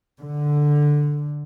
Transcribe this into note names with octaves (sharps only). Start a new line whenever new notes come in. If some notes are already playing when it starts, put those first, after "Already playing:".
D3